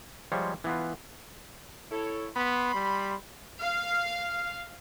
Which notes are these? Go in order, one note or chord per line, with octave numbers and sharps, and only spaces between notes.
F3 G3 G#3 C5 C#5
E3 B3 F4
E4 A4 C#5
B3 B5 C6
G3
F5